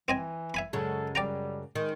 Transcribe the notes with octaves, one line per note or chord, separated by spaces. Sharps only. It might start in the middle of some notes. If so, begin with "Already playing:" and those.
E3 C4 D#5 G#5
E5 G#5 B5
F#2 C#3 G#3 A4
G3 D5 G5 A#5
D#3 G#3